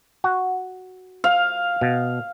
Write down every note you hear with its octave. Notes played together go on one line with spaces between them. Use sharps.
F#4
F5
B2